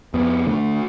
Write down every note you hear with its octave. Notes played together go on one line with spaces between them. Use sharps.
F2 B3
D3 A3